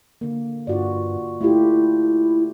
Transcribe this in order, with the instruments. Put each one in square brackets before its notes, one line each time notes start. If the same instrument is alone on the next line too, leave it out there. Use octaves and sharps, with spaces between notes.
[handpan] D3 A#3
[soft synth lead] G2 [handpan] F4 F#4 D5
[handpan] A3 F4 G4 [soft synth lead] E4